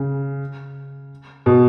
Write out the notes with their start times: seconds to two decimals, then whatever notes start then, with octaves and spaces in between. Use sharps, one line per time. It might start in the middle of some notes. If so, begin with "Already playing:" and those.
Already playing: C#3
1.46 B2